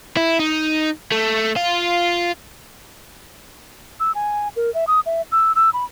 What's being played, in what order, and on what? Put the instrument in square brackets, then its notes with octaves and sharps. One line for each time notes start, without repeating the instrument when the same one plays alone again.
[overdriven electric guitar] E4
D#4
A3
F4
[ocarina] E6
G#5
A#4
E5
D#6
E5
E6
E6
B5